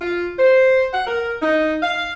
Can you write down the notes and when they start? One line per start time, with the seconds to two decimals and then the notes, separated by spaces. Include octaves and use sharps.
0.01 F4
0.38 C5
0.93 F#5
1.07 A#4
1.42 D#4
1.82 F5